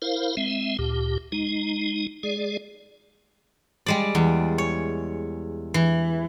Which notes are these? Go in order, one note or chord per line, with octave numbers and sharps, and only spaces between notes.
E4 A#4 C5 F5
G#3 C4 E5
D2 A#2 G4
G#3 D#4
G#3 G#4 D5
G3 G#3 D5
E2
C#5
E3